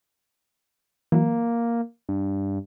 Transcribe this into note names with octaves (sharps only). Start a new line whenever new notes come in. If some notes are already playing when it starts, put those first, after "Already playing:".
E3 F#3 A#3
G2